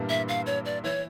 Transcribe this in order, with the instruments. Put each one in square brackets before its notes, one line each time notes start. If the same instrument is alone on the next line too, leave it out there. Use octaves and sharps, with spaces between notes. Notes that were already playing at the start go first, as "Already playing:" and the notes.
Already playing: [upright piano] G2 A#2 E3 G3 A#3 E4
[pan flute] E5
F5
C#5
D5
[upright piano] E3 E4 [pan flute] C#5